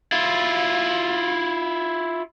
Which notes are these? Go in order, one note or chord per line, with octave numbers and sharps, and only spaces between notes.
E4 F4